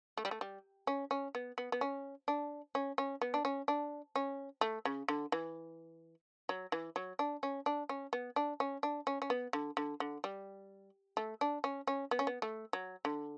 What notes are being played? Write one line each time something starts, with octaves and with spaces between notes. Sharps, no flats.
A3
G3
A3
G3
C#4
C#4
B3
B3
B3
C#4
D4
C#4
C#4
B3
D4
C#4
D4
C#4
A3
C#3
D3
E3
F#3
E3
F#3
D4
C#4
D4
C#4
B3
D4
C#4
D4
C#4
C#4
B3
D3
D3
D3
G3
A3
D4
C#4
C#4
B3
C#4
B3
A3
F#3
D3